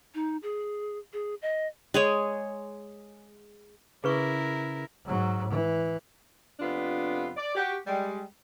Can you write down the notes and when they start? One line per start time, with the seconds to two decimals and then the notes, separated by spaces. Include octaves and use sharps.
0.15 D#4
0.43 G#4
1.13 G#4
1.42 D#5
1.94 G#3 G#4 C#5
4.04 C#3 E4 G#4 A#4 B4 C#6
5.05 G#2 F#3
5.50 E3
6.60 F2 C3 B3 D4 F4
7.37 D5
7.55 F#4 G4
7.87 G3 G#3